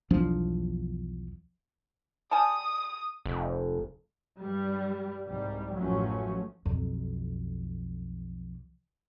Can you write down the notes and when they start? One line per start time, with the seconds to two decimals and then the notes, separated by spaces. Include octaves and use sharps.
0.10 B1 E2 F3 D4
2.31 G3 G#5 A5 D#6
3.26 F1
4.37 G2 G3
5.26 C2 G#2 G3
5.75 A1 F#2 F3 F#3 A3 C#4
6.65 B1 F2